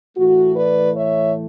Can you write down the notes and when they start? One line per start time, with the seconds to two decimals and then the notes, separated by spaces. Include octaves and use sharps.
0.16 A2 E3 A3 F#4
0.55 B4 D5
0.95 C#5 E5